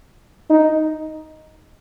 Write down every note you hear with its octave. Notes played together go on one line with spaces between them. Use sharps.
D#4